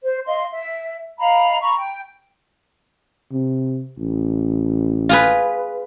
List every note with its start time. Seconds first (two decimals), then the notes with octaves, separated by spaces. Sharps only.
0.03 C5
0.26 D#5 F5 C6
0.51 E5
1.18 D#5 F5 A#5 B5
1.60 A#5 B5 C#6
1.76 G5
3.32 C3
3.99 A1
5.09 F4 G#4 B4